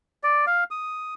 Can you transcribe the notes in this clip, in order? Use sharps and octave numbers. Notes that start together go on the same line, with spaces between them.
D5
F5
D#6